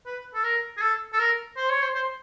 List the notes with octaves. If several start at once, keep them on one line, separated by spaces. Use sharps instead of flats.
B4
A4
A#4
G#4
A4
A4
A#4
C5
C#5
C5
C5